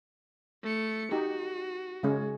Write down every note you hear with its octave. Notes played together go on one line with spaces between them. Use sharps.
A3 C#7
D#4 F#4 G4
C#3 G#3 C#4